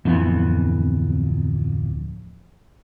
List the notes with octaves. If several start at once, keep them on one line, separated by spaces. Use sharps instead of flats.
D1 F2 E3 B3